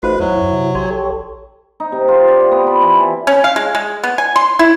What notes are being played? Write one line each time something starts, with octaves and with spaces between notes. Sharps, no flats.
A1 A3 D#4 F4 F#4 B4 C5
E2 F#3 E4
F#2
C3
A#1 G4 C#5 G#5 C6
G4 A4 C#5
D#4
C3
F4
D5
G5
B3
B5
E3
A5
C#4
F5
G#3
G#3
B3
G#5
C6
E4